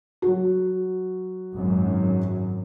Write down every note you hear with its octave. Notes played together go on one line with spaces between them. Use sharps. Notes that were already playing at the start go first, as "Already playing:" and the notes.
F#3 F#4
G#1 F#2